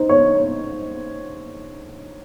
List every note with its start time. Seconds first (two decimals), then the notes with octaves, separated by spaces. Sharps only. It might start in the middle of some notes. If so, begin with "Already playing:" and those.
Already playing: D#4 C5
0.09 C#5